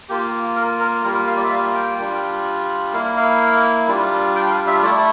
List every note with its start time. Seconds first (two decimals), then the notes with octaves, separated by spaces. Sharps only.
0.09 A#3 F4 G4
0.56 A#4
0.80 A#4
1.04 G3 A#3 F4 A#4
1.27 F5
1.37 D5
1.44 E5
1.51 F5
1.75 G5
1.99 G3 D4 F4
2.93 A#3 E4 F5
3.17 F5
3.88 G3 D4 F4
4.35 G5
4.51 F5
4.67 E5
4.82 A3 E4 D5